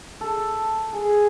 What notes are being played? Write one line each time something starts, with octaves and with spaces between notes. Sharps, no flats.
A4
G#4